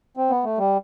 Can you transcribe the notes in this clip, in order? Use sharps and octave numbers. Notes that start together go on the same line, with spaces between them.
C4
B3
A3
G3